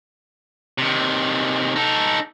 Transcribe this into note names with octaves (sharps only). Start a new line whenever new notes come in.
C3 D#3
D#4 A4